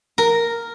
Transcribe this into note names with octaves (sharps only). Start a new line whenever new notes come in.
A#4